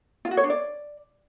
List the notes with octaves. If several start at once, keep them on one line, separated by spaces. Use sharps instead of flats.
F4
F#4
C#5
D4
D5